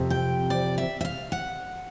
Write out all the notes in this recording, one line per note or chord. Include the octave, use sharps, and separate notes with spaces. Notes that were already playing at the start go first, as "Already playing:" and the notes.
Already playing: F2 C3
G5
D5
E5
E5
F5
F#5